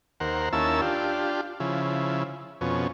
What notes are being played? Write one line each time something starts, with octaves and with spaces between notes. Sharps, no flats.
D#2 A#4 C5 F#5
D#2 A#3 C#4 E4 A5 E6
D4 F4 G4
C#3 F3 E4
F2 B2 C#4